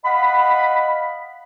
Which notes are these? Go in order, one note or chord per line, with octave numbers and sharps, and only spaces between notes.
D#5 F5 F#5 B5